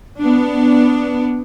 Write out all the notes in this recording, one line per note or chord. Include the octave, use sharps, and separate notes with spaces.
B3 D4